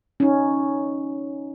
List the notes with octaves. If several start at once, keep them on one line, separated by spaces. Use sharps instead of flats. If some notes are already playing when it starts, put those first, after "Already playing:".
C#4 D#4